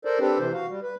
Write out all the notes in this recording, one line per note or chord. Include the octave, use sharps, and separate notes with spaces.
A4 A#4 C5 D5
C4 D4 G4 A4 B4
C3 E3 C5
F#4 F5
G3
B4